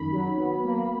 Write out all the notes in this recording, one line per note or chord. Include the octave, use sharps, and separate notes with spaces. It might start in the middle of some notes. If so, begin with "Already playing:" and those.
Already playing: F#2 D#3 B5
F#3
B3
A#3